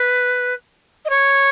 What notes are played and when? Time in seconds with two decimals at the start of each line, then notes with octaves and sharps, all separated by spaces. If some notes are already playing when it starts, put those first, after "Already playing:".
Already playing: B4
1.05 D#5
1.10 C#5